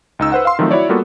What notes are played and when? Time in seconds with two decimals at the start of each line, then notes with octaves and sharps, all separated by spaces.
0.19 C#2 D#4 E6
0.32 B4 C5 F#5
0.45 F5 C6
0.59 D#3 F3 F#3 A3 C4
0.71 E4 F#4 C#5 D5
0.89 G3 A#3 B3 F4 F#4 A4